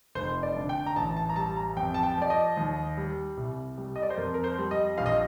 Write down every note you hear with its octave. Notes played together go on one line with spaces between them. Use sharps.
F1 C5
D5
D3
G5
A#5
A1 A5
A5
A#5
G3 A5
A#5
F2 G5
A5
G5
F3 D5
D#5
D#2
G3
C2
G3
D#5
D5
C5
F2 A#4
A#4
C5
G3
D#5
A#1 F5
D#5